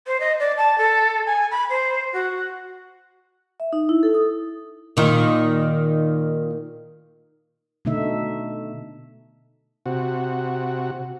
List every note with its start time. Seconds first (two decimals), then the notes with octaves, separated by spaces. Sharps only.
0.07 C5
0.20 D#5
0.40 D5
0.58 A5
0.78 A4
1.26 G#5
1.51 B5
1.69 C5
2.13 F#4
3.60 E5
3.73 D#4
3.89 E4
4.03 A4
4.14 D#6
4.97 A#2 D#3
7.85 B2 D3 A3 D#4 E5
9.86 C3 F#4